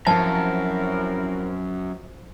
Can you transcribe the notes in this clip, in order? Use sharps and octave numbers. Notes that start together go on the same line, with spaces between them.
F#2 F3 C4 E4 A#4 F5 A5